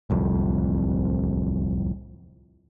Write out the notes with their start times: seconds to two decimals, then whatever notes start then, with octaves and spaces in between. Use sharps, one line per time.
0.10 D1 C2 F2